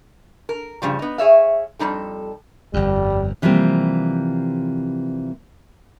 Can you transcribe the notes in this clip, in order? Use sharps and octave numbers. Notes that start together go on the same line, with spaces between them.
A#4
G2 C#3 F3 G3
B3 D#4
G#4 C#5 E5 F5
F2 A#2 G3 D#4 A4
G1 F2 G3
C3 E3 F3 G3 A#3 C4